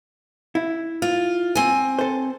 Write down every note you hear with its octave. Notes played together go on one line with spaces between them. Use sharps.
E4
F4
C4 G#5
A4 C5